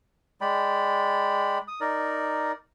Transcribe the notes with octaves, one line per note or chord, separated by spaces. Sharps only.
G#3 D5 G5 B5
D#6
D#4 A#4 D5